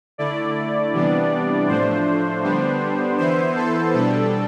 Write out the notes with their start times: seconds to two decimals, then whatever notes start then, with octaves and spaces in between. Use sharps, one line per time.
0.18 D3 A3 E4 D5
0.93 C3 E3 G3 B3 D4
1.67 A2 F3 A3 D4 C5
2.43 D3 G3 B3 D4
3.18 E3 B3 E4 C5
3.56 A4
3.93 B2 G3 D4 A4